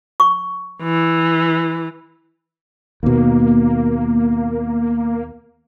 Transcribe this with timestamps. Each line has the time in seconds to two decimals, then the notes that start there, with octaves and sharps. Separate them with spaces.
0.20 C#6
0.82 E3
3.03 D#2 B2 A#3